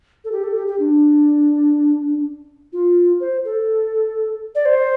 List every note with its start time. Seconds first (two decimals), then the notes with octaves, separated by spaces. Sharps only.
0.25 A4
0.32 G4
0.44 A4
0.56 G4
0.67 G4
0.79 D4
2.73 F4
3.21 C5
3.45 A4
4.55 D5
4.66 C5